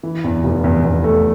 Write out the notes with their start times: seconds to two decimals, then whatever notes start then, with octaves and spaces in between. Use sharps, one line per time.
0.03 E3
0.24 E2
0.44 F1
0.64 E2
0.84 E2
1.04 A3